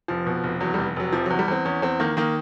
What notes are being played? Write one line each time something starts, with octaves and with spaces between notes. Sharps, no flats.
F1 F3
B2
F1
E2 F#3
F1 G3
F1 F#3
C3 F3
E2 F#3
G3
E2 C4
E2 C#4
E2 C4
D#3 A#3
D#3 A#3